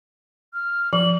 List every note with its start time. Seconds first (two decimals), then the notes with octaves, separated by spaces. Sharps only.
0.53 F6
0.93 F3 F#7